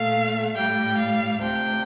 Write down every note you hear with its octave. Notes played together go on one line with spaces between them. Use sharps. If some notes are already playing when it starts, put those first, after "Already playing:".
Already playing: A#2 A3 F5
A2 G3 G5
F5
D2 C3 F3 G5